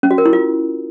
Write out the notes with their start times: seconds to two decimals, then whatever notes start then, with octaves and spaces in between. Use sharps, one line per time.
0.03 C#4
0.11 F#4
0.18 A#4
0.26 E4
0.33 F4